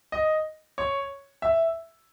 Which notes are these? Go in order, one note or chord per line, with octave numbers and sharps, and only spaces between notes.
D#5
C#5
E5